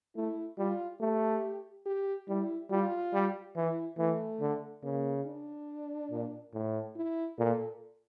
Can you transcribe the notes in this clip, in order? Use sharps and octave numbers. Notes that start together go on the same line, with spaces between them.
A3 E4
G3 F4
A3 G4
G4
G3 E4
G3 F4
G3
E3 E4
E3 A3
D3
C#3 A#3
D4
A#2
A2
E4
A#2 A4